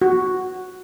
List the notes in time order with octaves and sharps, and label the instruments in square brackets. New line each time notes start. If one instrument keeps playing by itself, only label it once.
[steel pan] F#4